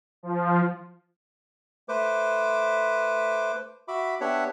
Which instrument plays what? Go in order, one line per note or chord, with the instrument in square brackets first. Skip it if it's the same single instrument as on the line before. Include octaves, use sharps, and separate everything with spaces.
[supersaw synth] F3
[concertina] A3 B4 C5 D6
F#4 E5 B5 D6
B3 D4 G4 C#5 E5 F#5